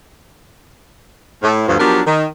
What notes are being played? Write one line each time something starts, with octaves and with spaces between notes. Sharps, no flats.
A2
D2 G2 F3
F3 F#3 B3 D4 G4 A#4
D#3